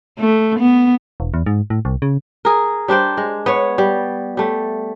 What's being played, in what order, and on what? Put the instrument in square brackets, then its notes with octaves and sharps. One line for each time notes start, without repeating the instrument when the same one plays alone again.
[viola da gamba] A3
B3
[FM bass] E1
E2
G#2
A2
C2
C#3
[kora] G#4 A#4
G3 D4 C5 G5
G#3
B3 C#5
G3
G3 A3